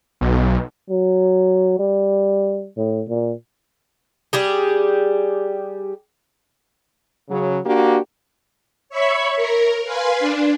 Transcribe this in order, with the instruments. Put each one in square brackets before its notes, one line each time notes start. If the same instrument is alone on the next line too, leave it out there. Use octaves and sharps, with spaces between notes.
[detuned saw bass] B1
[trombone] F#3
G3
A2
A#2
[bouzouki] G3 G4 G#4
[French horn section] C#3 F#3
A#3 D4 F#4 G4
[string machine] C#5 E5 B5 C#6
A#4
B4 F5 G#5 C6
D4